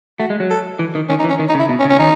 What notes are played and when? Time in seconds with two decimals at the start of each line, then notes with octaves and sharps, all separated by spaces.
0.20 A3 F#4
0.30 G#3
0.40 F#3
0.51 A4
0.79 E3
0.95 D#3
1.09 D#3 C#4
1.19 D#4
1.24 E3
1.30 C#4
1.39 D#3
1.49 D#4
1.55 C#3
1.59 E4
1.69 B2
1.80 C#4
1.85 C#3
1.90 C#4
1.99 D#3 D#4